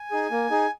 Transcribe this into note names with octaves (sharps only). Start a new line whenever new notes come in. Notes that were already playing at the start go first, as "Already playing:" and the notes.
Already playing: G#5
D#4 G#4
A#3
D#4 G#4